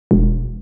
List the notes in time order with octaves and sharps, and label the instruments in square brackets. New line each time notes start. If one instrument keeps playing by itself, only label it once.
[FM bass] E1